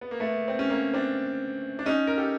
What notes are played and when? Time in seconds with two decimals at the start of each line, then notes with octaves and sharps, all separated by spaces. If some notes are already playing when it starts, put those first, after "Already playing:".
0.01 B3
0.11 A#3
0.20 A3 B3
0.48 C4
0.59 C#4
0.70 A#3 C4
0.93 C4 D4
1.79 D4
1.86 C#4 D#4
2.07 A#4
2.17 G4 A4